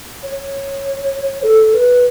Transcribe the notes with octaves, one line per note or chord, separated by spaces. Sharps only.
C#5
A4
B4